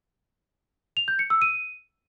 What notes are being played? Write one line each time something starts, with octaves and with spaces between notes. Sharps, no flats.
F7
G6
C#7
E6
D#7